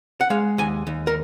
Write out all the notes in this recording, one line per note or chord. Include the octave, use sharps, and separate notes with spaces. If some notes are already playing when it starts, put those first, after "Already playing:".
F#5
G#3 F5
D#2 G#5
D#2
A#4